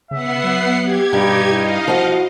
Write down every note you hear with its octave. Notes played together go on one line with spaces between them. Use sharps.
C#3 B3 E5 F#5 C7
F#3
G4 G#6
G2 B2 D#4
E4 D#5 F5
F3 F#4